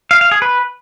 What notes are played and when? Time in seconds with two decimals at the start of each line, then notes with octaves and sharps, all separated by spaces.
0.11 F5
0.21 F5
0.31 G#4
0.42 B4